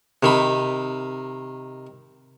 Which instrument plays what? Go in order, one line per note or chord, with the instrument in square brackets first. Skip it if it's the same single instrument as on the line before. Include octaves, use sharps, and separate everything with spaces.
[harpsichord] C3 D#3 B5